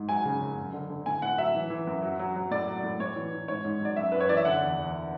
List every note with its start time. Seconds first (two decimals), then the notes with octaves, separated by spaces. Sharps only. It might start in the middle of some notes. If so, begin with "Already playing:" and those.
Already playing: G#2
0.09 F#3 G#5
0.25 C#3
0.41 F#2
0.58 F#2
0.73 D3
0.90 D3
1.06 A2 G#5
1.22 A2 F#5
1.38 F#3 E5
1.55 E3
1.70 E3
1.87 F#2
2.02 F#3
2.19 F#3
2.36 F#3
2.51 A2 D5
2.68 F#3
2.83 A2
2.99 A2 C#5
3.16 E3
3.33 E3
3.48 G#2 C#5
3.65 G#2
3.81 F#3 D5
3.96 F#2 E5
4.12 F#2 B4
4.20 C#5
4.29 E3 D5
4.37 E5
4.45 D3 F#5
4.62 E2
4.77 E2